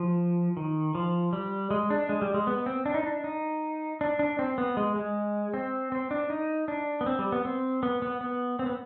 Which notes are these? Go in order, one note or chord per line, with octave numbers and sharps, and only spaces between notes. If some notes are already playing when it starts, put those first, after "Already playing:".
Already playing: F3
D#3
F3
G3
G#3
D4
G#3
G3
G#3
B3
C4
D4
D#4
D4
D#4
D4
D4
C4
B3
G#3
G#3
C4
C4
D4
D#4
D4
B3
C4
G3
B3
C4
B3
B3
B3
C4
B3